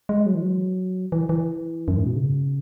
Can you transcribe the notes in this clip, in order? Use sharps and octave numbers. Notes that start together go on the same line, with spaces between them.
G#3
F#3
E3
F#3
E3
E3
F#2
G#2
B2
C#3